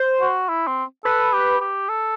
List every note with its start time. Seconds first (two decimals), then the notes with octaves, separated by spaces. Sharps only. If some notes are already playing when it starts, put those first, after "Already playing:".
Already playing: C5
0.21 F#4
0.49 E4
0.67 C4
1.05 A4 B4
1.33 G4
1.61 G4
1.89 A4